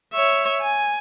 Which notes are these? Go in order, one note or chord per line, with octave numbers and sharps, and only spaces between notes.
C#5 E5
G#5